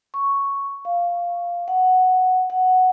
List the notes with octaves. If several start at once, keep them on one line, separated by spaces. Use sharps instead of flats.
C#6
F5
F#5
F#5